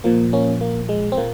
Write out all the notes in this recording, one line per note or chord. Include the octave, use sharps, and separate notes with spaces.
A#2 F3 A#3
A#3 C#4
A#3
G#3
C4
A#2 A#3